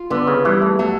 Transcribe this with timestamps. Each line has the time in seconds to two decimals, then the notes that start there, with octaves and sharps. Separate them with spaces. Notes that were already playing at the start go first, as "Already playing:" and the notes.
Already playing: F4
0.10 D3 B3
0.27 C#3
0.45 E3 G3
0.62 A3
0.79 F#3 A3